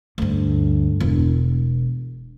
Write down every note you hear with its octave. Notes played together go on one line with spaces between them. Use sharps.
D2 G2
E1